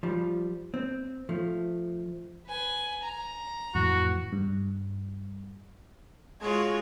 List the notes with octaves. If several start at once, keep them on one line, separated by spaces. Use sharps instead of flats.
F3 G3
C4
F3 A3
B4 G#5
A#5
F2 A2 E3 F#4
G2
G#3 F4 F#4 C#5